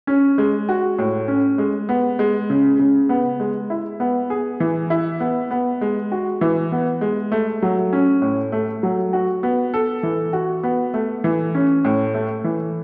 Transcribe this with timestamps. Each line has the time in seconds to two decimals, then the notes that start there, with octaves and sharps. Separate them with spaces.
0.07 C#4
0.38 G#3
0.69 F#4
0.98 A2
1.28 C#4
1.58 G#3
1.89 B3
2.19 G#3
2.50 C#3
2.79 C#3
3.09 B3
3.40 G#3
3.70 E4
4.00 B3
4.30 G#4
4.60 E3
4.90 E4
5.20 B3
5.51 B3
5.81 G#3
6.12 F#4
6.41 E3
6.72 B3
7.01 G#3
7.32 A3
7.62 F#3
7.93 C#4
8.22 A2
8.52 A3
8.83 F#3
9.13 F#4
9.43 B3
9.74 A4
10.03 E3
10.33 F#4
10.63 B3
10.94 A3
11.24 E3
11.55 C#4
11.85 A2
12.15 A3
12.44 E3